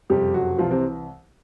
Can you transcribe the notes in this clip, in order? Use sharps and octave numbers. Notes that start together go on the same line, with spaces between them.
F#1 F2 C3 G3 G4
F#3 F#4
C2 C3 E3 F3 F4
C3 C4